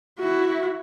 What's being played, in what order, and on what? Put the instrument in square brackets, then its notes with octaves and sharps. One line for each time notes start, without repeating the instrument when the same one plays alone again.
[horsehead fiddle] E4 F#4